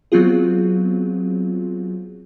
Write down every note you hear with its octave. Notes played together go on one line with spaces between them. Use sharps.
F#3 B3 C4 F4 G#4